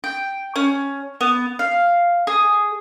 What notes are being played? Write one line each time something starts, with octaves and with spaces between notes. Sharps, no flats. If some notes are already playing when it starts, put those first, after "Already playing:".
G5
C#4
B3
F5
G#4